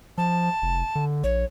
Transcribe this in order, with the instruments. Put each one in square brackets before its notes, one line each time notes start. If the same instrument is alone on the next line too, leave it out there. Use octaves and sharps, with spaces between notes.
[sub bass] F3 [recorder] A5
[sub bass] F1
D3
[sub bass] A#1 [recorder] C#5